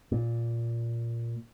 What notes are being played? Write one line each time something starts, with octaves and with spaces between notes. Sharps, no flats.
A#2